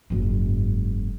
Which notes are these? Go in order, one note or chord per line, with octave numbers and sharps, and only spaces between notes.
F#1 G#2